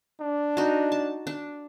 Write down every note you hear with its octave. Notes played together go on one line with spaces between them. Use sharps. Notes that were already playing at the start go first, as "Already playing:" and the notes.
D4
D#4 F#4
A5
D4